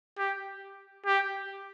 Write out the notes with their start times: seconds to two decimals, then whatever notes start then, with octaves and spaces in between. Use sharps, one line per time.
0.18 G4
1.06 G4